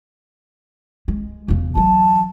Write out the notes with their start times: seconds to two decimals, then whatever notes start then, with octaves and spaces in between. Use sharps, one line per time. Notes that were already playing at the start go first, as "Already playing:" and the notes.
1.08 G#3
1.48 E2 C#3
1.75 E3 F#3 A5